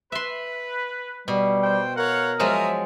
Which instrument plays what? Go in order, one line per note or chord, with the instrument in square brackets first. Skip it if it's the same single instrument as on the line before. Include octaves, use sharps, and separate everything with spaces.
[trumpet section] B4 [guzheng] E5 C6
[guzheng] B2 [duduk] G3
[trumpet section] C5 G5
[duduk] A#4 [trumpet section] C#5 F5 F#5
[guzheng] F3 F#3 G#3 [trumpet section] E5 A#5 D#6